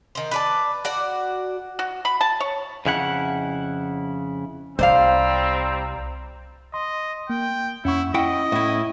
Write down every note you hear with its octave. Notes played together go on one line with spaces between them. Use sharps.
D#3 C5
B4 D5 A5
F#4 D5 F#5
F#4
B5
A5
C#5
F2 C#3 E4 F#5
C2 G3 C4 C5 D5 F5 A#5
D#5 C6
A#3 G5
F2 C#4 E4 F#5 C#6
E4 D#5 F#5 G5 C#6
A2 E4 E5